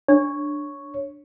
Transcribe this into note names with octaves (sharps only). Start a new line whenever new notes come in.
D4 C#5